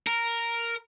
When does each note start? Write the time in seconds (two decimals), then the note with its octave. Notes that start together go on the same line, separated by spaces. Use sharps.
0.07 A#4